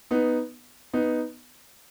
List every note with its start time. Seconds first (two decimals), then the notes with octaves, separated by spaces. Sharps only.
0.11 B3 D#4
0.93 B3 D#4